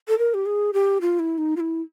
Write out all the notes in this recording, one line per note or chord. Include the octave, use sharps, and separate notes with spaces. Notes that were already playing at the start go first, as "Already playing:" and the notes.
A4
A#4
G4
G#4
G4
F4
E4
D#4
F4
E4